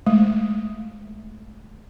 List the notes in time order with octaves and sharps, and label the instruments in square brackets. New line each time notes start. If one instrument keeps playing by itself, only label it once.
[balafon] G#3 A3